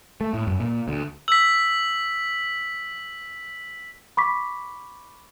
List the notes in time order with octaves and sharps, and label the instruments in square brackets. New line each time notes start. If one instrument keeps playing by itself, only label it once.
[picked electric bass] A3
A2
F#2
A#2
D2
[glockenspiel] E6 [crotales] B6 F#7
[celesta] B5 C#6 D6 B6